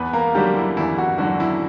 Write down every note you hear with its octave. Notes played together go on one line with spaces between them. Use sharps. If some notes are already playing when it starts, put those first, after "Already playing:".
Already playing: E2 B3 B4
A#3 A#4
D3 F#3 G3 G4
E4
E2 E4
E4
F#4
D3 F#3 F#4
E4